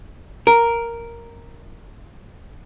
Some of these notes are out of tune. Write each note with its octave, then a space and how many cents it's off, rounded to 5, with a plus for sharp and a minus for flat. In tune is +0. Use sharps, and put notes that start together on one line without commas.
A#4 +0